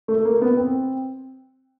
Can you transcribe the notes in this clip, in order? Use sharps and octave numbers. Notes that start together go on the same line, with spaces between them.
A3
A#3
B3
C4